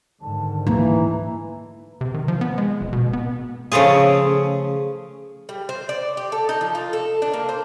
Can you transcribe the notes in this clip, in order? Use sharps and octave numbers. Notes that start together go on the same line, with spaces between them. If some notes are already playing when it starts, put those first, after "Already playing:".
G#2 D3 D#3 A5
E3 A#3 D#4 A#5
C3
D#3
F3
B3
G#3
D#1
B2
B3
C#3 F3 A3 F4 G#4
G3
C5
D5
G4
A4
D#4
F3
F4
A4
D4
A#3
C5